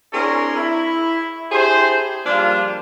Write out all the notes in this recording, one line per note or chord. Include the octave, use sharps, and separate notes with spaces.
C4 D4 E4 G#4 A#4 C#5
E4
D4 E4 G4 G#4 C5
F3 G3 A#3 D4 F4